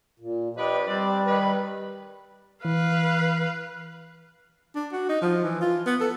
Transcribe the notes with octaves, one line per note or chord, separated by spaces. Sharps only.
A#2
F3 D4 G4 B4 D#5
G3 C4 B4 D5
D#3 B4
E3 B4 F5
D4
F#4
D#4
F3
E3
F4
B3
A4